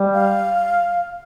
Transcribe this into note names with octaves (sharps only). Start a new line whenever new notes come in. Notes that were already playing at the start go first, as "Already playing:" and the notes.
Already playing: G3
F5